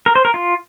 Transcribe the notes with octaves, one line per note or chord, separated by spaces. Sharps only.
A#4
C5
A#4
F4